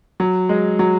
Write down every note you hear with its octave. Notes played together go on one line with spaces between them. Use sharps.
F#3
G#3
F#3